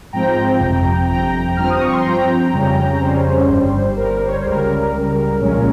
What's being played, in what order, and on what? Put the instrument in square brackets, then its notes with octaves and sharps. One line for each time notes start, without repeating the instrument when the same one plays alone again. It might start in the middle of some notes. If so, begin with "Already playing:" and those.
[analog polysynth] G#2 F3 C4 G5 A#5
G1 F2 C3
G1 F2 C3 G5 A#5
G2 F3 C4 F6
D#6
C#6
C6
G2 F3 C4 G5 A#5
F2 C#3 G3 C#4
F2 C#3 G3 C#4 C5
G1 G2 G3
G1 G2 G3 A#4
C5
C#5
C5
C#2 C#3 G3 A#4
C#2 C#3 G3
A#1 A#2 G#3 C#4